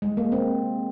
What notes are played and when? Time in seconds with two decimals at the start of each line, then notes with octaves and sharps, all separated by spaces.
0.02 G#3
0.17 A#3
0.32 C4